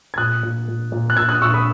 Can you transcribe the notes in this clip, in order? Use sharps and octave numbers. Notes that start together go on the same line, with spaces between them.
G#6
A#2 D#6 F#6
A#2
A#2
A#2
F#6
A#2 E6 G#6
D#6 F#6
A#2 C#6 E6
B5 D#6